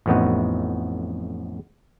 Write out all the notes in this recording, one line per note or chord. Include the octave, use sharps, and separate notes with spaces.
A1 F2 A2 B3 D#4 F#4